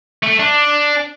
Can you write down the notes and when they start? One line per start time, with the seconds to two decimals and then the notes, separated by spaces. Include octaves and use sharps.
0.23 A3
0.40 D4